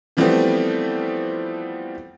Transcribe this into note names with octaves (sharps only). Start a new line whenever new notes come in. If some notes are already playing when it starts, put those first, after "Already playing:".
E3 F3 G3 A3 B3 C4